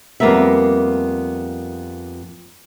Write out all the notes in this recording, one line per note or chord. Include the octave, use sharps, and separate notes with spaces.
F2 G3 A#3 B3 A#4 E5